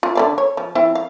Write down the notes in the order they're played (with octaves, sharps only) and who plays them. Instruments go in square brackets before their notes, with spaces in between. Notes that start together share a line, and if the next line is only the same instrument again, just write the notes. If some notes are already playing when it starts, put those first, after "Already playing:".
[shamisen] F4
D3 D5 F5
C#5
F3
F3 C4 E4
F5